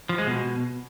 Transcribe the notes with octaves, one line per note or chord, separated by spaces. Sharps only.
F3
G#3
B2